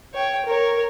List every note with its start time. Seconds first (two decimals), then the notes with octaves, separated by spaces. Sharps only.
0.14 C#5 G5
0.46 A#4 C#5